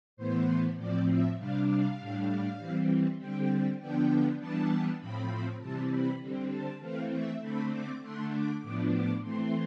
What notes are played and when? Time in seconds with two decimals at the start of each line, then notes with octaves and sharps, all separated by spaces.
0.17 A2 E3 B3 C5
0.78 A2 F3 C4 D5
1.07 E5
1.37 C3 G3 D4 F5
1.68 F5
1.98 A2 G3 D4
2.58 E3 G3 C4
3.18 D3 G3 C4 G5
3.79 D3 F3 B3 D4 G5
4.39 E3 G3 B3 D4 A5
4.99 A2 F3 C4 B5
5.60 C3 E3 G3 C4 A5
5.90 B5
6.20 D3 G3 C4
6.51 A5
6.80 E3 A3 C4 F5
7.11 E5
7.41 D3 A3 C4 B5
7.71 D6
8.01 D3 A3 D4 C6
8.32 D6
8.62 A2 F3 B3 D4 D6
8.93 D6
9.22 E3 A3 C4 C6